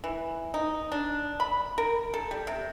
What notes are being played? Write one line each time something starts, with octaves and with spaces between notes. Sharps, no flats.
E3
D#4
D4
B5
A#4
A4
G3
C3